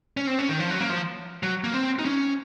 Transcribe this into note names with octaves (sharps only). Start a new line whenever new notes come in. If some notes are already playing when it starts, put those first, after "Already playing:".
C#4
C4
C#4
D#3
F3
F#3
A#3
F3
F#3
A#3
C4
D#4
C#4